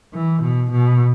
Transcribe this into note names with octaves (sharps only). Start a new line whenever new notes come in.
E3
B2
B2